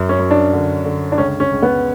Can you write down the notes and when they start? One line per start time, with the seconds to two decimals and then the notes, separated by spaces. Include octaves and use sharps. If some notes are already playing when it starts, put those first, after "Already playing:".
Already playing: F#2
0.09 C#4
0.19 F#2
0.31 D4
0.53 D3
0.85 D3
1.12 D4
1.18 C#2 C#4
1.40 C#4
1.52 C#2
1.62 B3